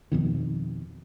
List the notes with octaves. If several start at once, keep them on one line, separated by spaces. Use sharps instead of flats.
F2 B2 D#3